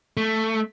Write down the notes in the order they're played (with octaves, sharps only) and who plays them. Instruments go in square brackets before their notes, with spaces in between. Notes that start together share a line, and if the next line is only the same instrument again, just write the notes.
[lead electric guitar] A3